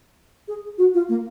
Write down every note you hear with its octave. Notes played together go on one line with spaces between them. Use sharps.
G#4
F#4
F4
A#3